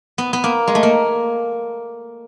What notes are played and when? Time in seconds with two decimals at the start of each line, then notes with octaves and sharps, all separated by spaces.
0.18 B3
0.33 B3
0.44 A#3
0.68 G#3
0.75 A3
0.83 A#3